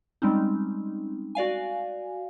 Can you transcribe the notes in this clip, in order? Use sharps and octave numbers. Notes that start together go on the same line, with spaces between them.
G3 G#3 C4 C#4 D#4
F#4 D5 F5 G#5